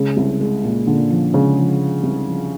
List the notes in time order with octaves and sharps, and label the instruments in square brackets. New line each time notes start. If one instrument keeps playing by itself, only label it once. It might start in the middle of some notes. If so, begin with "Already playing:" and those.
Already playing: [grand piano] C#3 [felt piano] G#3
[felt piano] C2
G#3
A#2
[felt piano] A#2 [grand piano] D3
[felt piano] F3
[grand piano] C#3 [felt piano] G#3
[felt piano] F3
G#3
C2
F3